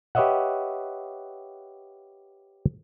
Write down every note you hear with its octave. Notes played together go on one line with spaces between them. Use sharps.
G4 B4 C#5 D#5 E5 F#5